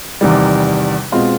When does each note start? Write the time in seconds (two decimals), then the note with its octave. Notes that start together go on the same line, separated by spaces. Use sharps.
0.21 E2 C3 D#3 G3
1.12 B2 G#3 C4 F4